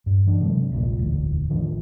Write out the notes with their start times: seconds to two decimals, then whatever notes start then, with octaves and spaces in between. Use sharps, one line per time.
0.06 G2
0.27 E3 D4
0.41 C3 F#3 G#3 C4
0.72 D#1 A#1 D#2 A#2
0.98 E1 D2 A2
1.50 A1 D#3 F3 D4